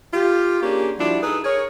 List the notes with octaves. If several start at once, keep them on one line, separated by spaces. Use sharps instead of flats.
F4 G4
A#3 C#4 D4 G4 G#4
F3 G3 D4 E4 F#4
D#4 G#4 A4 B4
G#4 A#4 C#5